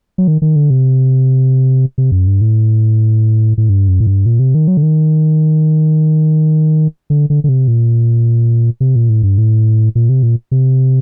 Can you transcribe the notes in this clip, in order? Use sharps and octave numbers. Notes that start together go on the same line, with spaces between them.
F#3
D#3
D#3
D3
C3
C3
F#2
G2
A2
A2
G2
F#2
A2
G2
A#2
C3
D#3
F#3
D3
D#3
D3
D3
D3
C3
A#2
C3
A#2
A2
G2
A2
A#2
C3
A#2
C3